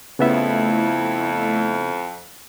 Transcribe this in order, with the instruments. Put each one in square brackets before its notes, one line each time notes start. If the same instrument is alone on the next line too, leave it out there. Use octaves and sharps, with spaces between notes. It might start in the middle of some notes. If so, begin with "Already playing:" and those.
[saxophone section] F2 [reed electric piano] C#3 B3 E5 [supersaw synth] A3 E4